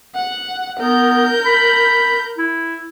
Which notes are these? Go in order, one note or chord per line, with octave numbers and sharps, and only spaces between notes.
F#5
B3 A#4 G6
B5
E4